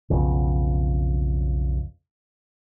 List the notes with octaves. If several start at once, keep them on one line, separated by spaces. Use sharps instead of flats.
B1 F2 C#3